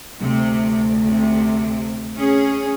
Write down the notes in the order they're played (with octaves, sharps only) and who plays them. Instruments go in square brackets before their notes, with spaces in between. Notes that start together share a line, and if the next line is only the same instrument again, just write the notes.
[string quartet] D2 [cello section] C3
[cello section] C3
C#4 G#4